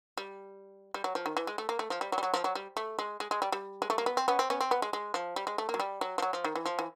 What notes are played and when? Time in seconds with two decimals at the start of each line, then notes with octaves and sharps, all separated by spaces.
0.17 G3
0.94 G3
1.04 F#3
1.15 F3
1.26 D#3
1.37 E3
1.47 G#3
1.58 A3
1.69 A#3
1.79 A3
1.90 F3
2.01 G3
2.12 F#3
2.18 G3
2.23 F#3
2.34 F3
2.44 F#3
2.55 G3
2.77 A3
2.99 G#3
3.20 G#3
3.31 G#3
3.42 G3
3.52 G3
3.82 G#3
3.90 A3
3.98 A#3
4.06 B3
4.17 C4
4.28 B3 C#4
4.39 C4
4.50 B3 C#4
4.61 C4
4.71 B3
4.82 G#3
4.93 G#3
5.14 F3
5.36 G3
5.47 G#3
5.58 A3
5.69 A#3
5.74 F#3
5.80 G3
6.01 F#3
6.18 F3
6.22 F#3
6.33 F3
6.44 D#3
6.55 E3
6.66 F3
6.79 E3